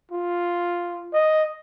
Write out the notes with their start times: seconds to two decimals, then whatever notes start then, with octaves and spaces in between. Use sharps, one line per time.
0.11 F4
1.13 D#5